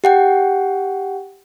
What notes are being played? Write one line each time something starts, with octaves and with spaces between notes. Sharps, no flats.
G4 F#5 G5